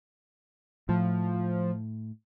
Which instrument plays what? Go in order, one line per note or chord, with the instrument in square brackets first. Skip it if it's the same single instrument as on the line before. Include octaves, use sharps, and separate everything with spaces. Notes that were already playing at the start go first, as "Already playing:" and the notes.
[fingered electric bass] A2 [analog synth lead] F3